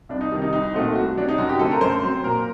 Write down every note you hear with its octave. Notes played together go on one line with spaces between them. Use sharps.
C2 D4
D#4
C3 D#3 G3
D#4
C2 D#4
A#2 A3 C4 F#4
C2 F#4
C3 F#3 D4
D#4
F#2 F#4
G4
D3 A3 C4 A4
A#4
F#2 C5
F#3 C4
A#2 A#4